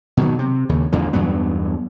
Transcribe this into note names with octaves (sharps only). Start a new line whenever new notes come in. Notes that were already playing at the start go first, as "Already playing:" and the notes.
B2 D#3 F#3
C3
D#2 C#3
A1 E2 D3 F3
E2 G2 F#3 B3